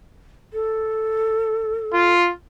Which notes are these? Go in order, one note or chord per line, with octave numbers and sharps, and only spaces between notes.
A4
F4